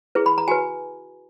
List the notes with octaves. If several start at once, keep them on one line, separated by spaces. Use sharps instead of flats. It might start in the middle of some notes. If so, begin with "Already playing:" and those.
E4 G#4 B4
B5
A#5
F#4 B4 G#5